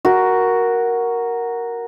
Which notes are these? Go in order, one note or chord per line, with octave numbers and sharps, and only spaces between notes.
F#4 A#4